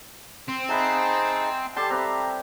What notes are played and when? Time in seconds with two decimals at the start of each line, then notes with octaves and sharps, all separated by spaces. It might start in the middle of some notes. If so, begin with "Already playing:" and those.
0.48 C4
0.69 D#4 G#4 E5 F#5 A5 B5
1.76 G3 G4 A4 A5 C6
1.90 C4 B4 E5 A#5